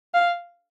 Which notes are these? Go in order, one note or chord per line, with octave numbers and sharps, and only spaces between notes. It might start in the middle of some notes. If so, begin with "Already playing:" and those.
F5